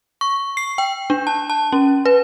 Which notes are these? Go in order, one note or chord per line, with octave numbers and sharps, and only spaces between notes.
C#6
C7
G5
D4
A5
A5
C#4
B4